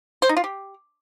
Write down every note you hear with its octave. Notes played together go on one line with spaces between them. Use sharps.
C5
D#4
F4
G4